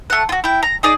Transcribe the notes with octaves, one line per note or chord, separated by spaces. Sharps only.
A3 F#5
F4 F#4
E4 G5
A#5
D#4 G#4 D5